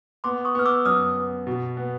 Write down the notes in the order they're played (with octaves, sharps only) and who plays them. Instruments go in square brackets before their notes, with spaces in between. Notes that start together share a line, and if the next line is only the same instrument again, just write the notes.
[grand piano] B3 [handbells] C6 D6
[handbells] C#6 D#6
[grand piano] B3 [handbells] F6
[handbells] D6 E6
[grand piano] F#2 [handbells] D#6 F6
[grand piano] B3
B2
B3